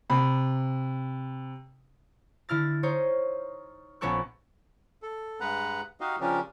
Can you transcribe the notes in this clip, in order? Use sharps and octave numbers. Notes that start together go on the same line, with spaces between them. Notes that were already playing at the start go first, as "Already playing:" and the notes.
C3 B5
D3 E4 F6 A6
D#4 C5 C#5
A#1 B3 C#4 A4 C#6 F#6
A4
G2 G#3 B4 F#5 A#5
D#4 F#4 G4 D#5 F5
C#3 F3 C#4 D4 G4 A#4